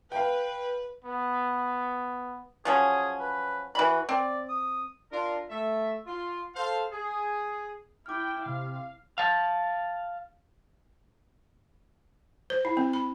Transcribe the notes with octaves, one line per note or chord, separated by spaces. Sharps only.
B4 F5 G5
B3
F3 F#3 C#4 G#4
B4
E3 F#4 B5
C4 D5
D#6
D4 F4 A#4
A3 E5
F4
A4 C5 F5
G#4
E4 G5 D6 F6
C3 F5
F5 A5
C5
E4
C4
B5